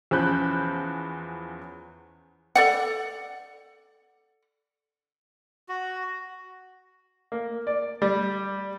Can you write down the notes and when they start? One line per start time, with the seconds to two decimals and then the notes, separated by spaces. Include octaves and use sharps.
0.11 E2 F3 C#4 B5 F#6 G6
2.55 A4 D5 F#5
5.69 F#4
7.32 A#3
7.67 D5
8.02 G3